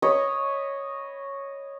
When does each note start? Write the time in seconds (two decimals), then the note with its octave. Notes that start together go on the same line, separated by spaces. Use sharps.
0.02 C#5 D#5 B5